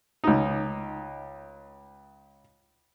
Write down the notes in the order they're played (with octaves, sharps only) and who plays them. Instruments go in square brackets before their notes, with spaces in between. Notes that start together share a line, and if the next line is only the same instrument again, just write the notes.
[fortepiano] C#2 D#4